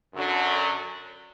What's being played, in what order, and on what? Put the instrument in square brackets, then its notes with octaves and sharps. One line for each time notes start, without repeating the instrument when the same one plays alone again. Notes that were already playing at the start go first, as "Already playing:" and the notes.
[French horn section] F#2 D3 F#3